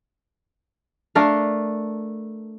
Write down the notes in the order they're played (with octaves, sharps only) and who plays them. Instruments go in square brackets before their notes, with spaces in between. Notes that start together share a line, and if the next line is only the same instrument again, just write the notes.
[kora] A3 D4 A#4 F5